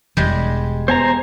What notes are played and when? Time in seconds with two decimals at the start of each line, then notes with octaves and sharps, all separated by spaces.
0.17 E1 G3 G#3
0.88 B3 C5 G#5 A#5